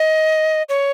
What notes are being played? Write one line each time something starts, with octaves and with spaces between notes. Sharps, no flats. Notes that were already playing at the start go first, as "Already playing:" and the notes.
Already playing: D#5
C#5